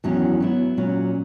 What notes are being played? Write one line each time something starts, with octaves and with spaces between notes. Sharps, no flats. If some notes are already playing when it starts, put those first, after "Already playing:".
E2 D#3 F#3 C#4 F#4
F#3 B3 E4
A#2 F#3 C#4